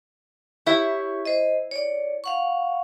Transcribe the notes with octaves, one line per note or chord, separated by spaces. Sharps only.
E4 G4 C#5 E5 C#6
C5 D#5
C#5 D5
F5 F#5 C#6